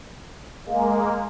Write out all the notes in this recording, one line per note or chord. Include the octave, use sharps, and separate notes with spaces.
G#3 A#3